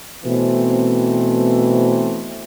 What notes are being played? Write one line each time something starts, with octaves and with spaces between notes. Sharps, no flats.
B2 E3 A3 C4